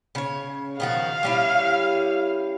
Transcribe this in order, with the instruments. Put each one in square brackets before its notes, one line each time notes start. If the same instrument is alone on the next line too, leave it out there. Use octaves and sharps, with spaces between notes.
[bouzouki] C#3 C#5
[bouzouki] D#3 F3 F#4 [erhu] F5
[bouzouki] G3 C#4 E4